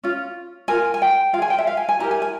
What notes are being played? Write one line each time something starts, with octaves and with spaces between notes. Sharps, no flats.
C#4 F4
F4 A#4 G#5
G#5
G5
F4 G#4 F5 G#5
G5
E5
F5
G#5
G#5
E4 G4 A#4 A#5
G#5
G#5